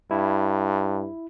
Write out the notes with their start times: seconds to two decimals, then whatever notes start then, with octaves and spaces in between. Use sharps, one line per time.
0.11 G2 E4